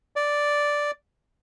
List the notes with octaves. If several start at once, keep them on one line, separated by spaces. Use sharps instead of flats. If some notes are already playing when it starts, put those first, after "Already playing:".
D5